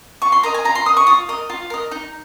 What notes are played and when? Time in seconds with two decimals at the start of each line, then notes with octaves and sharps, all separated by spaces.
0.22 F4 C#6
0.32 C6
0.43 A#4 D#5 A#5
0.54 G#5
0.65 F4 A#5
0.75 C6
0.86 A#4 D#6
0.89 D#5
0.97 C#6
1.07 F4 D#6
1.29 A#4 D#5
1.50 F4
1.70 A#4 D#5
1.91 D#4